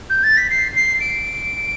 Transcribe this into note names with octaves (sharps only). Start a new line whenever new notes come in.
G6
A6
B6
C7
C7
D7